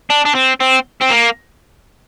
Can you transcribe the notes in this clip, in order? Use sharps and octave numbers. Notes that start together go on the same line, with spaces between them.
D4
D4
C4
C4
C4
A#3